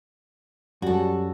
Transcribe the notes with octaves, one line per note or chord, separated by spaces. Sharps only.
F#2 G3 F#4 A4